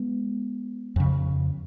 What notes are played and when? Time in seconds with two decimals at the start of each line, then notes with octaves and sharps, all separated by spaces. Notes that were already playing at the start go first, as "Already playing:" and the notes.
Already playing: G#3 B3
0.96 F2 C#3